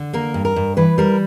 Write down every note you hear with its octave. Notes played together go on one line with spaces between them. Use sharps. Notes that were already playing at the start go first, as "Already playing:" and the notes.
Already playing: D3
A#3 A#4
G2
A#4
G2
E3 B4
G3 A#4